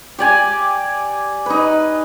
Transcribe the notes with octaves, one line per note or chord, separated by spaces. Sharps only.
G4 D5 G#5
D#4 B4